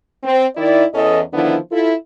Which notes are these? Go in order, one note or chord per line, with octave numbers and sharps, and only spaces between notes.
C4
D#3 E4 D5
E2 E3 C#4 A4 D#5
D3 D#3 F3 B3 D4 E4
E4 F4 A4